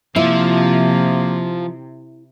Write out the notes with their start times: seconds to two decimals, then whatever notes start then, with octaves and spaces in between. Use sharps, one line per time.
0.16 C3 F3 A#3 E4